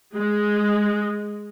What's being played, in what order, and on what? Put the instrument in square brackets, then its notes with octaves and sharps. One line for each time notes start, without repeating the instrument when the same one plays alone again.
[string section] G#3